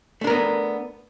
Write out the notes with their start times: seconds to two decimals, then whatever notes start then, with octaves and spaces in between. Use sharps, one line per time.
0.21 A3
0.24 D4
0.27 A#4
0.30 B3